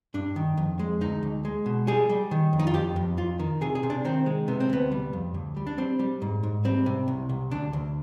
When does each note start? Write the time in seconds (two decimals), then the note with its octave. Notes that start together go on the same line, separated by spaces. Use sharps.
0.14 G2 D4
0.36 D#3
0.57 F2
0.79 G#3
1.01 D2 D#4
1.23 D2
1.45 G#3
1.66 B2
1.87 G3 G#4
2.09 G3
2.31 D#3
2.53 F2
2.59 D#4
2.67 F4
2.74 F2 G4
2.96 F2
3.17 F2 F4
3.39 D#3
3.61 C3 G#4
3.75 G#4
3.83 C3
3.90 D4
4.05 D#3 C4
4.26 G#3
4.48 C3 B3
4.60 C4
4.70 D2 B3
4.91 G3
5.13 F2
5.34 D2
5.57 G3
5.67 D4
5.78 G3 C4
5.99 G3
6.22 G#2
6.43 G#2
6.65 G3 C4
6.86 C3
7.08 C2
7.29 C2
7.51 D2 D4
7.73 D2